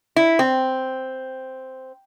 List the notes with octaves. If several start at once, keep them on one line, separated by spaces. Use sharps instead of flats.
E4
C4